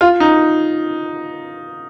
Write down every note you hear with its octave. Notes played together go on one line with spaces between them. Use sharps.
F4
D#4